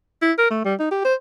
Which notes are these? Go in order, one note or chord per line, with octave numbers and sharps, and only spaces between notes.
E4
A#4
A3
G3
D#4
G4
C5